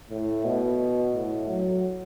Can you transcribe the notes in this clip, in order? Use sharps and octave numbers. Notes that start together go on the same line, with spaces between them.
A2
B2
A2
F#3